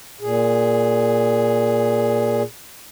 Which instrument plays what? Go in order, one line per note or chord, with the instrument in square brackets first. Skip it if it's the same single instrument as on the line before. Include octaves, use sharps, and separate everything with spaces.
[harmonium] A#2 G#4